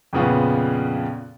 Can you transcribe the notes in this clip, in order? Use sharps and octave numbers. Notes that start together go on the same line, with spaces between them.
F2 A#2 C#3 F3 B3 C#4